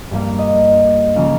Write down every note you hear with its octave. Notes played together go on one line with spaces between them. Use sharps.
G2 G3 A#3 F5
D#5
C#3 F3 A#3 F5